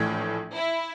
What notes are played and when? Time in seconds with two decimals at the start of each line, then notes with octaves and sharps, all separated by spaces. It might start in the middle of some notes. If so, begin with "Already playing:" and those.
Already playing: A#1 A2 E3
0.53 E4